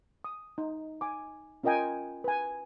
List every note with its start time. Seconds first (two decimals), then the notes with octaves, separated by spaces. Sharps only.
0.24 D#6
0.58 D#4
1.01 G#5 D6
1.64 C#4 F4 A#4 D#5 G5 G#5
2.24 B4 G#5